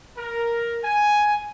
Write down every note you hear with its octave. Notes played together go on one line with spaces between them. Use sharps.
A#4
G#5